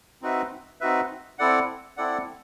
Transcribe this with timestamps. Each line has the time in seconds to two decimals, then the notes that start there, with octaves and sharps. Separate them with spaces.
0.22 C4 D#4 F#4 B4 E5
0.81 C4 D#4 F#4 B4 E5
1.39 C4 E4 A4 D5 F#5
1.97 C4 E4 A4 D5 F#5